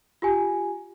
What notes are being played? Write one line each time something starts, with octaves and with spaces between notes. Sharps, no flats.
F4 G4 G#5